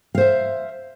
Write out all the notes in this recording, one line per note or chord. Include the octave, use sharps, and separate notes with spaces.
C5 E5 F5